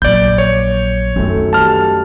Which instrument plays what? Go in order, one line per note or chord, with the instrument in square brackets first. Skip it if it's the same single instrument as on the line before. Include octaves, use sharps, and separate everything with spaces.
[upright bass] A#1 F#3 [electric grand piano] D5 G6
[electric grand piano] C#5
[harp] F#2 A3 C4 [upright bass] D#3 D#4
[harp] G3 B3 [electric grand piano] A5 F6